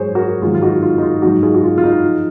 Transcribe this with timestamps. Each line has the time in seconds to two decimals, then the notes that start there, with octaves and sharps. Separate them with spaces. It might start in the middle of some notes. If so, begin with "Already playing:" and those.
Already playing: G#2 F#3 G#4 C5 C#5
0.15 F#4 A#4
0.42 G#2 D#3 F#3 F4 G#4
0.54 F4
0.61 D#4 F#4
0.82 F4
0.98 D#4
1.03 F4
1.22 G#2 F#3 D#4 F#4
1.43 F4 G#4
1.54 F#4
1.64 F4
1.78 F4
1.84 D#4
2.03 F3